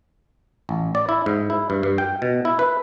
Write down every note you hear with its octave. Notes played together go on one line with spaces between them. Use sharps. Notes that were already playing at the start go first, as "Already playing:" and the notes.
A1
D5
E4
G#2
E4
G2
G2
G5
B2
E4
B4